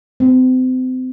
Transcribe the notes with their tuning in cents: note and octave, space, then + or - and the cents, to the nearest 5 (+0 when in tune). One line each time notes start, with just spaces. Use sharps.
C4 -35